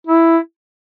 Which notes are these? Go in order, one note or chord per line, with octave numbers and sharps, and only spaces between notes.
E4